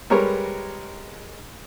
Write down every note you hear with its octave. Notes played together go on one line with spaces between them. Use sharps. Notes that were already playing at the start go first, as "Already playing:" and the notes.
G3 G#3 A#4 B4 C#5